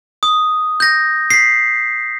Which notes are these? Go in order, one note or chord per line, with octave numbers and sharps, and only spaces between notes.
D#6
G6 A#6
B6 C7